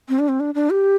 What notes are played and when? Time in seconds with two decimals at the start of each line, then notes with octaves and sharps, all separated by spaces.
0.09 C4
0.19 D4
0.28 C4
0.40 D4
0.55 D4
0.70 G4